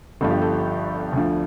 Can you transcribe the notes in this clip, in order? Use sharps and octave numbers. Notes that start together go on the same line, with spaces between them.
G1 G2 F3 A4
G4
A4
D2 D3 F3